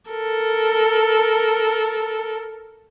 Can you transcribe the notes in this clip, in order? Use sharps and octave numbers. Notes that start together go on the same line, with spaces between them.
A4 A#4